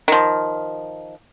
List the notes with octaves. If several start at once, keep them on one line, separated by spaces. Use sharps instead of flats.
D#3 F3